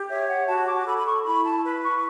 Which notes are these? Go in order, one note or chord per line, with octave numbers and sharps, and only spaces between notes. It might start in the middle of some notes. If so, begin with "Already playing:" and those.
Already playing: G4
C#5 E5
F#5
F#4 A5
D6
A5
A4 B5
B5
C#6
E4 B5
A5
B4 B5
C#6